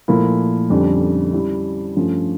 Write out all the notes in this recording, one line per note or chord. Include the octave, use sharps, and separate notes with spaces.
A#2 F3 A3 E4 A#4
F2 D3 G3 C#4
G3 C#4 E4
G2 F3 A3 C#4